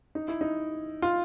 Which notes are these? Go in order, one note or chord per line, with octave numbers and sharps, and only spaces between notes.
D#4
E4
D#4
F4